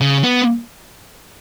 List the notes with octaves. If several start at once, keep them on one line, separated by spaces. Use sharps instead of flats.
C#3
B3